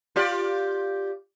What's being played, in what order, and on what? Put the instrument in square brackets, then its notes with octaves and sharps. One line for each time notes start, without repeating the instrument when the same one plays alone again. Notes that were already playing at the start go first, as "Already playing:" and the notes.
[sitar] F4 G4 D5